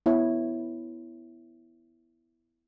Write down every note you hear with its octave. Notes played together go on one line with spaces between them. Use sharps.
B3 E4 C#5